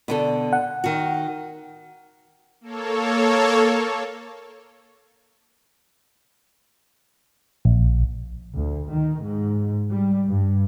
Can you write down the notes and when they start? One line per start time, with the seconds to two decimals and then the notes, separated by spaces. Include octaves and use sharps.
0.08 B2 D3 A4
0.53 F#5
0.84 D#3 F#4
2.61 A#3 A4 C#5
7.65 A#1
8.56 D2
8.92 D#3
9.24 G#2
9.90 G3
10.29 G2